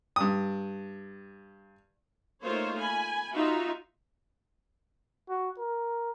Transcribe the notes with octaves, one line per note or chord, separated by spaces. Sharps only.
G2 D#6
A3 A#3 D#4 F4 C5 C#5
G#5 B5
D#4 F4 F#4 E5
F#4
A#4